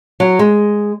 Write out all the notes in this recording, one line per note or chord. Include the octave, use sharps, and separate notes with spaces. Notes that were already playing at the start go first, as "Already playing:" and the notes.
F#3
G#3